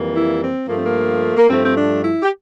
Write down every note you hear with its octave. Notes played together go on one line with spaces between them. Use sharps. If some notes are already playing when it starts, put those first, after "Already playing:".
Already playing: F2 E3 G3 A#3
E4
C4
G2 F3 A3 A#3
C4
A#3
A#3
G2 F3 A3 C4
C4
D4
E4
G4